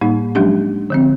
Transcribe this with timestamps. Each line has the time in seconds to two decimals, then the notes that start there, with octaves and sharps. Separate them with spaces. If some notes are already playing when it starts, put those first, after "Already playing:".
0.01 A2 G3 A#3 D#4
0.35 F3 F#3 G#3 C#4 D4 G4
0.90 D3 F3 C4